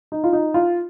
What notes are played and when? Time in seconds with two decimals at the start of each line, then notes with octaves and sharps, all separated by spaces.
0.12 D#4
0.24 F4
0.33 D#4
0.54 F4